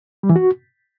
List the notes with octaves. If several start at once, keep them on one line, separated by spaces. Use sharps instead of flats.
G3
E3
F#4